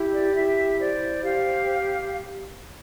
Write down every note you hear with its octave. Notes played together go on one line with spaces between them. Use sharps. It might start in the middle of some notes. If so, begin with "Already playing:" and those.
Already playing: E4 G4
D5
E4 E5
C5 D5
G4 F5